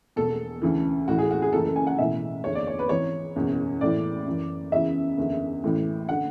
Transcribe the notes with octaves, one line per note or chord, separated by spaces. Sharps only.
E1 E2 B2 A4
D2 C#3 E3
A1 A2 E3 F#4
G#4
F#4
G#4
F#1 F#2 C#3 E3 A4
A4
G#5
F#5
B1 A2 E3 E5
F#1 E2 D3 C#5
D5
C#5
B4
G#1 G#2 E3 C#5
F#1 E2 B2
A1 A2 E3 D5
F#1 F#2 E3
F#1 E2 C#3 E3 E5
F#1 E2 D3
A1 A2 E3
D3 F#5